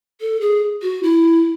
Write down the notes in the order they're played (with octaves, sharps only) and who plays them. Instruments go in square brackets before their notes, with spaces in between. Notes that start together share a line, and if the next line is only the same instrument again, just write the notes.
[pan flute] A4
G#4
F#4
E4